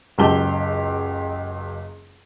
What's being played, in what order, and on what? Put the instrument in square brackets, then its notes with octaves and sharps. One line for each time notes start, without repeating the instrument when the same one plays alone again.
[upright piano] F#1 C#2 F#3 G4 A5 G7